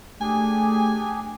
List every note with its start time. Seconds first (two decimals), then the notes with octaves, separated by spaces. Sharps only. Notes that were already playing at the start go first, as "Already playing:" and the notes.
0.21 A3 D4 G4 G#4 G#5